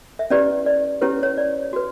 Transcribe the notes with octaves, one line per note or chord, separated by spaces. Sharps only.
E5
C#4 E4 G4 B4 D5
D5
C#4 E4 G4 B4 C#5
C#5
D5
F#4 B4